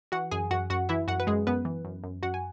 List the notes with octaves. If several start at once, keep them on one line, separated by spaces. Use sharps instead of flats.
E3 F#4 F#5
F#2 G#4 G#5
F#2 F#4 F#5
F#2 F#4 F#5
E3 E4 E5
F#2 F#4 F#5
B4
F#2 G#3 G#4
F#2 B3 B4
E3
F#2
F#2
F#2 F#4 F#5
G#5